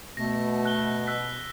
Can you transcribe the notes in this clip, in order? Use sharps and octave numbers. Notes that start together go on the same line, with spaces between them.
B2 A3 A#6
F#6 G7
E6 F#6 B6